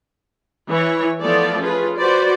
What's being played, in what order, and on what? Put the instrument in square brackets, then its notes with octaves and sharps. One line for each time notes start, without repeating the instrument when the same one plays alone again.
[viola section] E3 C#5
F3 A3 B3 F4 A4 D5
C#4 F4 G#4 B4
F#4 B4 C5 D5